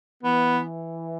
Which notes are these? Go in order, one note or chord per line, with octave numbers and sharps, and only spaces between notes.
E3 B3